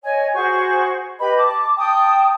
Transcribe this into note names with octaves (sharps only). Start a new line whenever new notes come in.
C#5 D#5 G#5
F#4 G#4 C5 C#6
G4 B4 D#5 B5
A5 D6
G5 A5 D#6